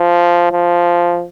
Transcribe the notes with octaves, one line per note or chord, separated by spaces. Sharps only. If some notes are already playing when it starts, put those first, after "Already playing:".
Already playing: F3
F3